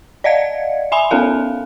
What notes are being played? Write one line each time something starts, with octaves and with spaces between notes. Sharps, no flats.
D5 D#5 F5 F#5 G#6 C#7
E5 G#5 B5 C6 F7
B3 C#4 A4 A#4 F5